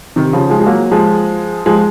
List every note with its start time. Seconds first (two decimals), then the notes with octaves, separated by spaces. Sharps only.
0.16 C3 D#3
0.33 C#3 F3
0.50 F3 G#3
0.60 G#3
0.66 F#3 A#3
0.91 F3 G#3
1.66 F3 G#3